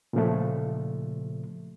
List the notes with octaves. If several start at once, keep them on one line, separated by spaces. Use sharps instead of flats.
A#2 C#3 F3 A3